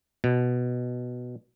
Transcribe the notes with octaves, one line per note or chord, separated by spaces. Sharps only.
B2